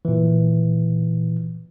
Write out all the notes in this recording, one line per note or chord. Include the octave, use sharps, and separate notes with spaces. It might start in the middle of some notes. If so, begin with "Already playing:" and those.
A#2 E3